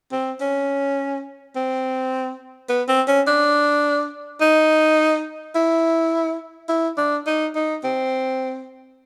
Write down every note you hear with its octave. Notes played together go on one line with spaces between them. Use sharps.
C4
C#4
C4
B3
C4
C#4
D4
D#4
E4
E4
D4
D#4
D#4
C4